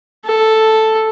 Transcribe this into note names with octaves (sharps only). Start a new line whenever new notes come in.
A4